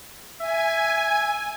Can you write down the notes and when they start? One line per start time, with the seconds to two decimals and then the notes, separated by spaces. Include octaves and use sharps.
0.41 E5 G#5